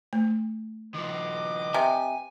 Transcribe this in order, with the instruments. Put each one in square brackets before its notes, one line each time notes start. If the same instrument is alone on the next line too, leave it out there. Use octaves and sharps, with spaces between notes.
[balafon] A3
[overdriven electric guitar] D#3 F3 [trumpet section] B4 D#5 D6
[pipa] C3 [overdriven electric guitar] G#5